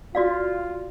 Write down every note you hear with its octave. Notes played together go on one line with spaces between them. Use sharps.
F4 F#4 D5 F5